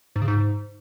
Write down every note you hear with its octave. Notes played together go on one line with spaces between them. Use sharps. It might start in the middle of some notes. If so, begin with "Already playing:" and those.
G#2
C#3
G#2